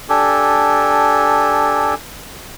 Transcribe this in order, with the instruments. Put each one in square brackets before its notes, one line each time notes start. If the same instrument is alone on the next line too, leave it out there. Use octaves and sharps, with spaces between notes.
[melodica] D4 G4 A4 G#5